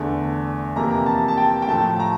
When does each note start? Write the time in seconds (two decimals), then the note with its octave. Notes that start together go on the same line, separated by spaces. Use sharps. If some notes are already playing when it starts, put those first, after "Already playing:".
Already playing: E2 D3 A3
0.76 F2 C3 E3 A#3 A#5
1.06 A5
1.28 A5
1.37 G5
1.62 G5
1.68 A2 F3 A3 A5
1.99 A#5